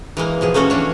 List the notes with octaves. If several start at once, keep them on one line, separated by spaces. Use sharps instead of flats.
E3 G#3 A#3
B2 F3 G#4
A3 A#3 C#4 F#4 A4
E3 D4 C#5